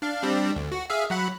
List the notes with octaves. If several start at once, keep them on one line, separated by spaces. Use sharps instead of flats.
D4 F5
G3 C4 D4
D2
F#4
G#4 E5 F5
F#3 F#5 B5